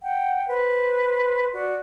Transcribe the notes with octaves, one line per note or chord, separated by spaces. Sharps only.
F#5 G5
B4 C5
F#4 D5